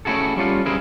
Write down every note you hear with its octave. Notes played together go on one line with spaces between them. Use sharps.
A3 C#4 E4 F#4 G#4 A4
G3 C#4 F4 A4
G3 C#4 E4 G#4 A#4 C5